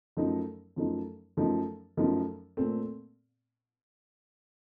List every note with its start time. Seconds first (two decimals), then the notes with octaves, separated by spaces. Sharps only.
0.17 F#2 F3 A3 D#4
0.76 F#2 F3 A3 D#4
1.37 F#2 F3 A3 D#4
1.97 F#2 F3 A3 D#4
2.57 A#2 A3 C4